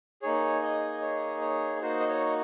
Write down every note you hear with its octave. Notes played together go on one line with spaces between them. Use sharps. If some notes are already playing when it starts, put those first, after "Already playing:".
A#3 D#4 G#4 C#5
D#5
C#5
C#5
A#3 D#4 F#4 C5
D#5
C#5